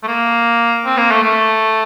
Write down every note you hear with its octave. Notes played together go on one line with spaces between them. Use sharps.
A3
A#3
C4
A#3
A3
A3